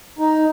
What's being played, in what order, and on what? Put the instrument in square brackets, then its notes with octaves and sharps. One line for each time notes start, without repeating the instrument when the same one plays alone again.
[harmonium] D#4